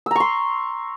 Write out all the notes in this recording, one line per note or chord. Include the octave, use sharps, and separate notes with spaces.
A#5 C6 C#6 E6